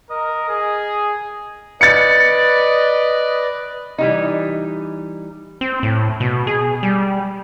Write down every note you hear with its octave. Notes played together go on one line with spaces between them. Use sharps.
A#4 D#5
G#4
B4 D5 D#5 A6 C#7
E3 G3 D#4
C4
A2
B2
G#4
G3